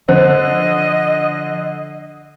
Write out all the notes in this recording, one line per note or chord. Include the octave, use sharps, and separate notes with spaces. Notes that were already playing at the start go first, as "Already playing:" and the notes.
D3 F3 C5 D#5